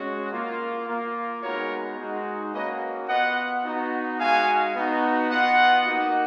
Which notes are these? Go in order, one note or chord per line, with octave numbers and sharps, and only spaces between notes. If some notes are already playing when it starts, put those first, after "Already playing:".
Already playing: G#3 C#4 F#4
A#3 F4
A#3 F4
G#3 B3 D#4 F#4 A#4 C#5
G#3 D#4 F#4
A#3 C#4 F#4 B4 D#5
B3 F4 D#5 F#5
B3 D#4 F#4
G#3 D#4 F#4 F5 G#5
B3 D#4 F#4
B3 F4 D#5 F#5
A#3 D#4 F#4